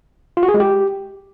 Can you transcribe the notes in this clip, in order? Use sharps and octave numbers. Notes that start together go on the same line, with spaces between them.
F4
F#4
G#4
G#3
G4